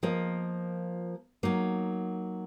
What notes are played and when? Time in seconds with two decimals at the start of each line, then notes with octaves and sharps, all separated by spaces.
0.03 F3 A#3 F4 A#4 D#5
1.43 F#3 A#3 D#4